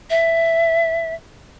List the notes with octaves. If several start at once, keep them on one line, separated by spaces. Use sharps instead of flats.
E5